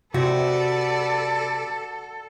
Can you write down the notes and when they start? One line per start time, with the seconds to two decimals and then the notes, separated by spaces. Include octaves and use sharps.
0.14 C3 F#4 A4 B4 D5